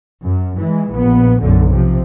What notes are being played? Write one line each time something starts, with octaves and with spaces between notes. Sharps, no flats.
F#2
E3 G#3
A#1 B3
B1 F#2 D3
C3 F3